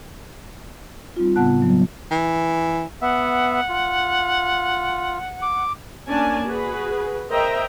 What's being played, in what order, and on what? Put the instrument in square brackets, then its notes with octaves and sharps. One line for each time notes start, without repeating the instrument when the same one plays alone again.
[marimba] G3 C4 D#4 F4
A2 C#3 B3 F#5 A5 F#6
F#3 G3 B3
[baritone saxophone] E3
[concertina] B3 E5 [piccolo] F#5
[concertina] F4
D6
[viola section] A#3 C#4 D4 D5 G#5 A5
F#4 G#4 B4
A#4 C5 D#5 E5 G5 A#5